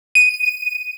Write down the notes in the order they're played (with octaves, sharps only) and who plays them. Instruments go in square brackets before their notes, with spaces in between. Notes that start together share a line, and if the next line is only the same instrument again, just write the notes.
[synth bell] D#7